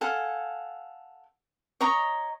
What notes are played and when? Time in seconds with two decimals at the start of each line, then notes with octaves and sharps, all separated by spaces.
0.01 A4 F5 F#5 G#5
1.81 C#5 D#5 A#5 C#6